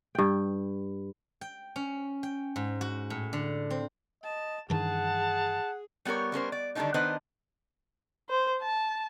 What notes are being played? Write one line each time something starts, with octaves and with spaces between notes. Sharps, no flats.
G2 G5
G5
C#4
G5
G#2
F#4
A2
D3
C4
D#5 A5
G2 D#3 E3 G#4 F#5 A5
G3 B3 G4 A#4 C#5
G3 C#4 A#4 C5
D5
D3 D#3 F#3 G3 D4 D#4
D#3 B3 D4 B4 C5 D#5
C5
A5